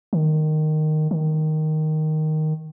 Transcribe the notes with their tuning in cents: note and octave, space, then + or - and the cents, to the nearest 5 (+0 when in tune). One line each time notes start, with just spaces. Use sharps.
D#3 -10
D#3 +0